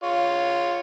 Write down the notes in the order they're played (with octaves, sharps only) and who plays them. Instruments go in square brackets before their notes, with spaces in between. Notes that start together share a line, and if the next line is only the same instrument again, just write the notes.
[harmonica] F4 C#5